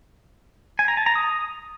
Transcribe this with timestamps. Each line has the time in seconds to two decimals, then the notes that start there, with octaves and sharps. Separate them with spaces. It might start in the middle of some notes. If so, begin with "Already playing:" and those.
0.79 G#5
0.88 A#5
0.97 A5
1.06 A#5
1.15 D#6